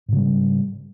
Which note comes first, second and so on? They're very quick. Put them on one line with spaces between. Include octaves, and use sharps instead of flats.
G#2 C#3 G3